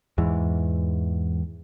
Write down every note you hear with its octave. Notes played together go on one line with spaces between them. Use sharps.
E2 G#2 E3